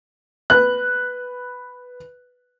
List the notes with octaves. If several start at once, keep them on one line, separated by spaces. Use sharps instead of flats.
B4 F#6